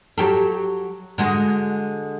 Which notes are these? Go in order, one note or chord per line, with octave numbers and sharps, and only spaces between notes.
F#3 G4 A4
D3 G#3 F#4